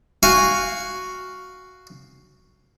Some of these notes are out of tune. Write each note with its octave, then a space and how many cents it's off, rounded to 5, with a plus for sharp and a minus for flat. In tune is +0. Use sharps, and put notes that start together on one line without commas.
F#4 +0 F5 +0 G#5 -20